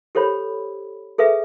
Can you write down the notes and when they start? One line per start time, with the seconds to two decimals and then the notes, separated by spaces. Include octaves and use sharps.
0.15 G4 A4 C5 C#5 B5
1.18 G#4 A4 B4 E5